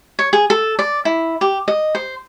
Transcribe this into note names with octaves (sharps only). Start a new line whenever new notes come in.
C#5
G#4
A4
D5
E4
G4
D#5
C5